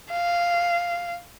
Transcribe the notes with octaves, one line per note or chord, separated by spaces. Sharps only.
F5